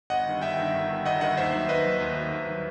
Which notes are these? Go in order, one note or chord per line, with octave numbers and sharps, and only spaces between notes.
G1 D#5 F#5
G2 D#3
G1 E5 G5
G2 D#3
G1
G2 D#3
G1 D#5 F#5
G2 D#3 D#5 F#5
D#2 C5 E5
D#3 F#3
D#2 B4 D#5
D#3 F#3
D#2
D#3 F#3
D#2
D#3 F#3